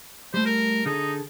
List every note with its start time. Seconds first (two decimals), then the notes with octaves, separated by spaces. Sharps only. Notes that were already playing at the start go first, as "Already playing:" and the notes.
0.34 G3 A3 C5
0.45 A#4
0.86 D3 D#4 G#4 A4